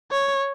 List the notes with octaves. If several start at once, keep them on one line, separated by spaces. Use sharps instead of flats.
C#5